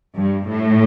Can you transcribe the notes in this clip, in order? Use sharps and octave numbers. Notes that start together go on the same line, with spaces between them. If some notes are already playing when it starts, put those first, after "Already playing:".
G2
A2